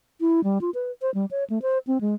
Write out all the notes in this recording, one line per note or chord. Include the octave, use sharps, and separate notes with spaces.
E4
G3
F4
B4
C5
G3
C#5
A3
C5
C4
G#3